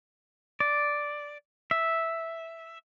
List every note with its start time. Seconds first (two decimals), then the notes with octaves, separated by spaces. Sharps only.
0.60 D5
1.71 E5